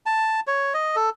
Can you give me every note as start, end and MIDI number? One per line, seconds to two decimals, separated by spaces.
0.06 0.40 81
0.47 0.74 73
0.74 0.96 75
0.96 1.10 69